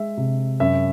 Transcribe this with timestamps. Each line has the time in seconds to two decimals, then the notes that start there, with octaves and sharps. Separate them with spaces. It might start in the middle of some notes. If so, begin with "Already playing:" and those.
Already playing: G#3 E5
0.17 C3
0.60 F#2 E5